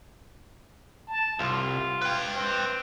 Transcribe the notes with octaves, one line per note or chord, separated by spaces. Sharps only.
A5
C2 F4
B4 G5
C4